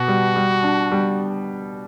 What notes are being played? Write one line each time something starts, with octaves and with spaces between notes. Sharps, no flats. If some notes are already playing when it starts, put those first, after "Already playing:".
Already playing: B2 B3 F#4
G3
G3
D4
G3